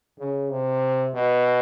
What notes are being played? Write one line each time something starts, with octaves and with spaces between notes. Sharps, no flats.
C#3
C3
B2